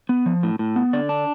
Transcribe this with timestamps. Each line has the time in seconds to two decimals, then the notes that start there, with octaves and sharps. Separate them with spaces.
0.09 B3
0.26 F3
0.43 A2
0.59 A2
0.76 B3
0.93 D3 D5
1.09 D4